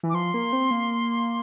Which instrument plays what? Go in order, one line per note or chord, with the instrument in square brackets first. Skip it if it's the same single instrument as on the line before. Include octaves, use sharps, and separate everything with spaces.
[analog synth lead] E3
[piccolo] D6
[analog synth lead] F3 [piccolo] C6
[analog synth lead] A#3
C4
A#3